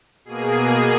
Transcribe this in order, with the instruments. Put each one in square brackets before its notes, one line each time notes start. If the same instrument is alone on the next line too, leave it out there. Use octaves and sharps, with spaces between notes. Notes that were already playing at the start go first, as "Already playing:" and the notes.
[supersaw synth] B2 A#3 G#4